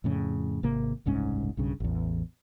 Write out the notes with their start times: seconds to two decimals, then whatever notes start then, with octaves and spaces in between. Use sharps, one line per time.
0.04 F2 A2 C#3
0.63 G#1 C3 A#3
1.06 F#1 C2 G#2 C#4
1.57 B1 G2 C#3
1.80 A1 E2